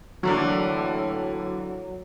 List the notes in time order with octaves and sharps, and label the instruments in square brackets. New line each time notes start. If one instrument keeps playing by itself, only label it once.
[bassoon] A2 [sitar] D3 E3 A#3 [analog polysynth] F#3 [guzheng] D4 B4 C#5